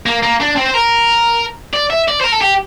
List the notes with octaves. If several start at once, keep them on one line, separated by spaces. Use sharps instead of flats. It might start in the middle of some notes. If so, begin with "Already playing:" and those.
A#3
A#3
D4
C4
C5
A#4
D5
E5
D5
C5
A#4
A4
G4